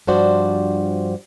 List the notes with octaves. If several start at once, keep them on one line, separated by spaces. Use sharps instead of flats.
G2 F3 D4 F#4 C5 D5